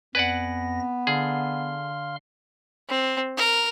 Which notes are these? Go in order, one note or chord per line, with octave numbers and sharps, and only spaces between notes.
F2 B3 B4 D5 F#5 G#5 A#6
D3 G#4 F5 C6 F6
C4
A#4